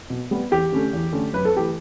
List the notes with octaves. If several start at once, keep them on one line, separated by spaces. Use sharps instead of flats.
B2
G3 B3
E2 G4
D3 A3 C#4
E2
D3 A3 C#4
F#2 B4
A4
E3 A3 G4